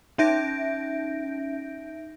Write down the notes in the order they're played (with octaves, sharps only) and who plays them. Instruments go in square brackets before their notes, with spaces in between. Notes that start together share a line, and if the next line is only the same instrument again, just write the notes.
[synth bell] C#4 D#4 E5 G6 A#6 D7